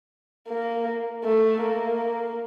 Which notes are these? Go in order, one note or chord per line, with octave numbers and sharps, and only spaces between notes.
A#3
A3
A#3